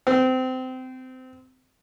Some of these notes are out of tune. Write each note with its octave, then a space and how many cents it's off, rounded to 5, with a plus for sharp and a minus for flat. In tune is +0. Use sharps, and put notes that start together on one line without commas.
C4 -25